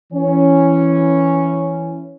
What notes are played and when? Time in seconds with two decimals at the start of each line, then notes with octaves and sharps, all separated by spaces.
0.11 E3 C#4